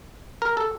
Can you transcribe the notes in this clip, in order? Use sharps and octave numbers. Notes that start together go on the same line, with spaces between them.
A#4
A4